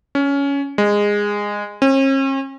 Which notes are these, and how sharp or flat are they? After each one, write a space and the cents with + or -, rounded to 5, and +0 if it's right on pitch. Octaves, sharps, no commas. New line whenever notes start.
C#4 +15
G#3 -15
C#4 -45